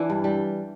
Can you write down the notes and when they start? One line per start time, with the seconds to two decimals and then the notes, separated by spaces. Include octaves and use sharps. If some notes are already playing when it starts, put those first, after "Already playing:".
Already playing: E3 D4 E4
0.10 G2
0.24 G3